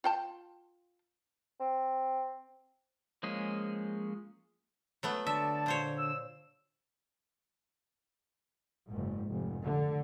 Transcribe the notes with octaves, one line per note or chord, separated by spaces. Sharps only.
F4 G5 A5
C4
F3 G#3 A#3 C#4 G#4
F#3 A3 B3
D3 D5 E5 A5
A#2 C5 C#5
E6
F#1 G#2
F1
D3